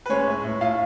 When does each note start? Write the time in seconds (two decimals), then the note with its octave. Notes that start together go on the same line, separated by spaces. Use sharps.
0.06 B4
0.09 G#3 C#4 C#5
0.27 A2
0.44 A2
0.61 A2 F4 F5